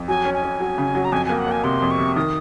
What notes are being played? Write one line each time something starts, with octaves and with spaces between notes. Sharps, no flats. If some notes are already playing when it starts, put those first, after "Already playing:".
Already playing: F2
F#3 G#5
C#4
G#5
C#4
F#3
C#3
F#3
A#5
F2 G#5
A#3 G#5
F#5
A#3 G#5
C3 C6
F2
C#6
C3
D#3 D#6